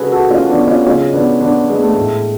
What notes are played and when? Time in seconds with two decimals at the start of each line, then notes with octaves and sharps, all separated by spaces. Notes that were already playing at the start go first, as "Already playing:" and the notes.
Already playing: C#3 G#3 F#4 G#4 A4 B4
0.12 F#4 A4
0.31 C#4 F4
0.49 B3 D4
0.67 C#4 F4
0.86 C#3 G#3 C#4 F4
1.13 B3 D4
1.41 B3 D4
1.69 G#3 B3
1.83 A3
1.97 A2 G#3